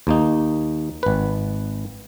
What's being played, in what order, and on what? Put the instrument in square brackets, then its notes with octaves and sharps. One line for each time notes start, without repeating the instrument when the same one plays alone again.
[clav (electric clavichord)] D#2 A#3 D#4
G#1 B4